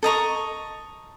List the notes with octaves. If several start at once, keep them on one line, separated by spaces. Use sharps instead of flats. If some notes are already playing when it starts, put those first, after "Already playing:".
A4 D#5 A#5 C#6